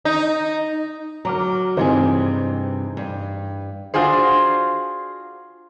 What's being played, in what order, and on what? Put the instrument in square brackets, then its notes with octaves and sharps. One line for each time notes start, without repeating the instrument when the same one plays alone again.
[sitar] D#4
[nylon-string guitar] F#3 [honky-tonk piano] A#5 D6 F6
[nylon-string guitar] G2 C3 G#4 [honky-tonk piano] E3 D#4 C5
[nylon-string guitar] G2
[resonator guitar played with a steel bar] D4 F4 F#4 G#4 C5